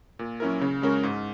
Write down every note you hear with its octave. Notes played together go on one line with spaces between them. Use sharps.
A#2
F#3 C#4 E4 A#4
C#3
G#3 C#4 F#4 A#4
G#2